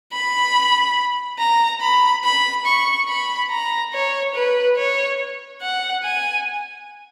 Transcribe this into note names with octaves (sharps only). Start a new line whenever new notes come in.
B5
A#5
B5
B5
C#6
B5
A#5
C#5
B4
C#5
F#5
G#5